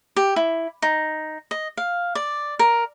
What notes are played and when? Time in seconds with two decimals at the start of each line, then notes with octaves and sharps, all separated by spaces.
0.16 G4
0.36 E4
0.82 D#4
1.51 D#5
1.77 F5
2.15 D5
2.59 A#4